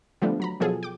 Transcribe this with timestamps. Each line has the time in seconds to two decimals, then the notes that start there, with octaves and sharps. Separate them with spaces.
0.21 D3 F3 G3 A3 B3 D4
0.40 F#3 A#5 B5
0.60 B2 F3 F#3 F4 G#4 A4
0.83 G5 D6